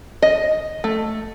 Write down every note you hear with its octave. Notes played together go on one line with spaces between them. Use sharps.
D#5
A3